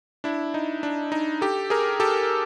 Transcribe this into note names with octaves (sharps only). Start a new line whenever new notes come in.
D4 E4
D#4
D4
D#4
G4 A4
G#4 A#4
G4 A4